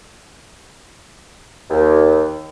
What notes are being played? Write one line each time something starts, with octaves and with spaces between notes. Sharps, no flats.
D#2